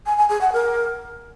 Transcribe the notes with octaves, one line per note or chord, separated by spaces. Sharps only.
G#5
G#5
G#4
F#5
A#4